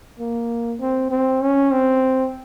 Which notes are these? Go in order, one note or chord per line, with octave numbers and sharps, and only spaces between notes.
A#3
C4
C4
C#4
C4